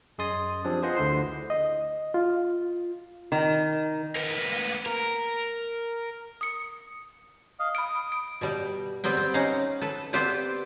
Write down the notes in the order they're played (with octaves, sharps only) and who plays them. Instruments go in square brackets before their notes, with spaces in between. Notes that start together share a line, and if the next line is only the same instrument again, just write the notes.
[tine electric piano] F#2 G#4 D#5 C6 D#6 A6
F3 C4 D4 G4 G#4
F4 G#4 B4 C5 D#5 F#5
D2 D3 E4 C5 C7
[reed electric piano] D#5
F4
[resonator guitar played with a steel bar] D#3
[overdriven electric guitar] A#3 B3
A#4
[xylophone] D#6 C#7
[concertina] D#5 F5
[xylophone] B5 D7 [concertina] D#6
[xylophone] D7
[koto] B2 G3
G3 B3 C4 G5
C4
C#4 D#4 F5 F#5
A4 B4
B3 C4 G4 B4 C5 D5